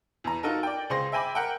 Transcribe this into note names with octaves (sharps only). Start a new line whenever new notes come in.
E2 A#5
D#4 F4 F#4 A4 A#4
D5 G5
C#2 G#4 C5 C6 A#6
E5 G5 G#5 B5 D6
A#4 F#5 G5